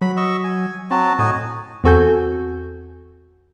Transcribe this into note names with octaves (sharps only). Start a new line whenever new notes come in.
F#3 B5
D#5 C#6 E6
G#5
F#3 C4 F#4 A5
A2 D#4 F#4 G#5
E2 C4 F#4 A4 G#5 G6